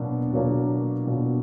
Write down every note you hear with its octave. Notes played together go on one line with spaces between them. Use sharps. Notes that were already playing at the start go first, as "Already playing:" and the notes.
Already playing: B2 F#3 A#3 D4
B2 F#3 A#3 D4
B2 F#3 A#3 D4